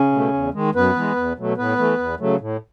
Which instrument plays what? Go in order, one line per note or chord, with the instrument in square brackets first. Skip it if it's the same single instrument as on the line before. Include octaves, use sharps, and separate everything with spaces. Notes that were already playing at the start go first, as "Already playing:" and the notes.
Already playing: [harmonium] C#3 C#4
B2 A3
E2
D#3 G#3
F#2 B3 B4
E3 G#3
E2
B2 F#3 A3
A2 B3 B4
E3 A3
E2
C#3 F#3 A3
A2